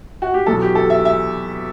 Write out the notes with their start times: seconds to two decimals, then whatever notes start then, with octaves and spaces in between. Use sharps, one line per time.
0.22 F#4
0.34 G4
0.46 E2 B2 F#3 A4
0.62 G4
0.75 A4
0.90 E5
1.05 E5